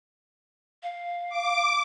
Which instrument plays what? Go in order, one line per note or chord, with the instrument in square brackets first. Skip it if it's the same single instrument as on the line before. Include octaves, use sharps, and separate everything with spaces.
[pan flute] F5
[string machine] D6